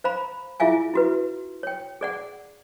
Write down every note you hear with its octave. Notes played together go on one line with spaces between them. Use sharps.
C5 F5 A#5 B5
E4 F4 G#4 E5 F5 G#5
E4 F#4 B4
C#5 G5
G#4 D5 F#5